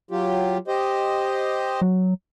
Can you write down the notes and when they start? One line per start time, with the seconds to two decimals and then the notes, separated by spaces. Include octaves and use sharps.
0.11 F#3 F4 G4
0.68 G4 C5 D#5
1.82 F#3